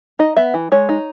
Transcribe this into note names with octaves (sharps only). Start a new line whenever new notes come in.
D#4 D#5
B3 E5
E3
G#3 C#5
D#4